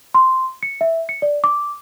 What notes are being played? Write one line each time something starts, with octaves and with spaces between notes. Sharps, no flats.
C6
C#7
E5
C#7
D5
D6